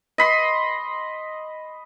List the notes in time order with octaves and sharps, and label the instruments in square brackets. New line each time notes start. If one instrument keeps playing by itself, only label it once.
[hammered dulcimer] D#5 B5 C6